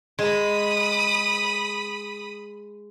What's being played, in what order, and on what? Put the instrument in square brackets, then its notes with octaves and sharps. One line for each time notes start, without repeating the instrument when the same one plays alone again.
[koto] G#3 [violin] B5 D#6